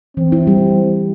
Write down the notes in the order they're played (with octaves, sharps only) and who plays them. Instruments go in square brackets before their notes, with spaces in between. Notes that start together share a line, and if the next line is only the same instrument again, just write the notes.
[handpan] E3 [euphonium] C4
[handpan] E4
G3